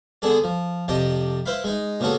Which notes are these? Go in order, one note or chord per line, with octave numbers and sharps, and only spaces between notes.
D3 B3 D4 G#4 A4 D5
F3
F2 C3 G4 D5 D#5 A5
E4 B4 C5 E5 F5 B5
G#3 D#4
A#2 C#3 A#3 B3 F#4 A4